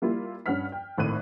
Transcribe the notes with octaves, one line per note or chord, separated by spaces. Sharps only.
G3 A#3 E4 F4
G2 C#4 F#5 F6 B6
G5
G#1 A2 D#3 F#6 D#7